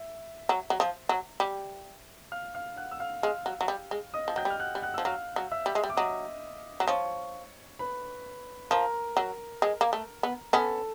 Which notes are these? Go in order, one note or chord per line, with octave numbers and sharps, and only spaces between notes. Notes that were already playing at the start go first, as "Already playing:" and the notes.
Already playing: E5
F#3
F#3
F3
F#3
G3
F5 F6
F5 F6
F#5 F#6
E6
F5 F6
G#3 F5 F6
F#3
F#3
G3
G#3
D#5 D#6
F3
F#3 G5 G6
G3
F6
F#5 F#6
G3
F#5 F#6
F3 E6
F#3 F5 F6
F#3
E5 E6
G3
G#3
G3
D6
F#3 D#5 D#6
F#3
F3 C#5 C#6
B4 B5
F3 A#4 A#5
F#3
G#3
A#3
A3
B3
B3 C#4 A4 A5